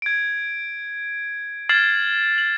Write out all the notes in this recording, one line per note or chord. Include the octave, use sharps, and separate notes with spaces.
G#6 D7
F6 G#6 A6 C7 E7 F#7
F#7